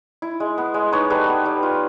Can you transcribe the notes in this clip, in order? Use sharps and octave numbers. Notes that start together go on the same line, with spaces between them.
E4
G#3
B3
G#3
D#4 B4 C#5
G3 A4 B4
B3
G3
F4